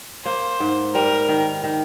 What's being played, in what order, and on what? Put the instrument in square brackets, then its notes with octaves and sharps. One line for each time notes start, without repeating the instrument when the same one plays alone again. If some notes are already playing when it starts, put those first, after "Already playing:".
[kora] A#3 [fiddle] C5
[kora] G#2
[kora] G3 [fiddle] A#4
[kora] D#3
D#3